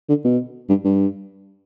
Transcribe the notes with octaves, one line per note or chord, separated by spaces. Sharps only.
D3
B2
G2
G2